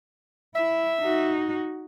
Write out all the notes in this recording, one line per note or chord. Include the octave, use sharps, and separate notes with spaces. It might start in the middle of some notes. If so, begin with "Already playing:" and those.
E4 E5
D#4 F#4